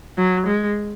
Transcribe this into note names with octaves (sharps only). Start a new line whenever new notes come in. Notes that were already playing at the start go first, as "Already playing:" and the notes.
F#3
G#3